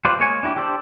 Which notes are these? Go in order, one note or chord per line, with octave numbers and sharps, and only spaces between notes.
G3 F4 B4 C5 D5
G#3 A#3 C#5 G#5
D4 E4 F#4 G4
D4 G4 A4 C5 D5